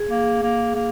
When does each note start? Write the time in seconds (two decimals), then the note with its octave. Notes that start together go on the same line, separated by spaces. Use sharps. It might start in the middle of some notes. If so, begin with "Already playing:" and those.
Already playing: G#4
0.09 A#3
0.42 A#3
0.75 A#3